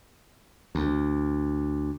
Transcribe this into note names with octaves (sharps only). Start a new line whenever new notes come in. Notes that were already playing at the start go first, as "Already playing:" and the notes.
D2